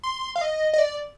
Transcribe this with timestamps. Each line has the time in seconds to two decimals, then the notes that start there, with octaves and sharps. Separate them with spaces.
0.03 C6
0.36 F5
0.41 D#5
0.73 D#5
0.78 D5